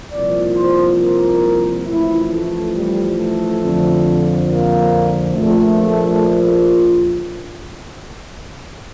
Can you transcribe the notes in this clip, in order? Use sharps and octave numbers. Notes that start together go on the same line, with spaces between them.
C2 A#2 F3 D5
C5
A#4
A1 A2 F3 E4
A3
G3
A3
F2 D3 F3
A#3
A#1 A#2 F3 A3